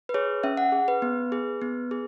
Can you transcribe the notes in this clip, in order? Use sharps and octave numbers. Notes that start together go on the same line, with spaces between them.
B4
G#4 C#5
C#4 E5
F#5
G#4
B4
B3
G#4
B3
G#4